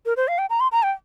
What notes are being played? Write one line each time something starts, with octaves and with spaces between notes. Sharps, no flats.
A#4
C5
F5
G5
A#5
C6
A#5
G5